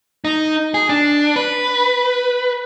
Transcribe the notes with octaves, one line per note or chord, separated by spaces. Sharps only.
D#4
G#4
D4
B4